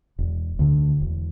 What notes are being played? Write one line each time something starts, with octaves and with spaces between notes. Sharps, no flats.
E1
D2 D3
E1